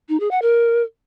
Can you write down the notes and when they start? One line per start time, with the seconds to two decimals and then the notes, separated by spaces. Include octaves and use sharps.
0.09 D#4
0.20 G#4
0.31 F#5
0.42 A#4